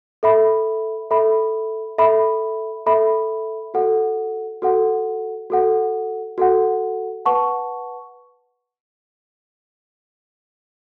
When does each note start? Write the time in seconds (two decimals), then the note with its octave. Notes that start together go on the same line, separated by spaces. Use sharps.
0.23 A4 E5 B5
1.11 A4 E5 B5
1.98 A4 E5 B5
2.86 A4 E5 B5
3.74 F#4 A4 F#5
4.62 F#4 A4 F#5
5.50 F#4 A4 F#5
6.38 F#4 A4 F#5
7.26 B4 F#5 A5 C#6